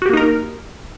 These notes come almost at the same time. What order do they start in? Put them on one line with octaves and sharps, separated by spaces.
F#4 G4 A#3 D#4 A#4